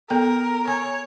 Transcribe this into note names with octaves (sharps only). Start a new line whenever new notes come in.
B3 A4 A#4 G5
C#5 G#5